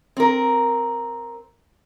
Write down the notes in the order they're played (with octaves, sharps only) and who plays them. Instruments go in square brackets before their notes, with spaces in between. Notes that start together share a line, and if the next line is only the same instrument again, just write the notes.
[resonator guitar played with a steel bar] C4 A#4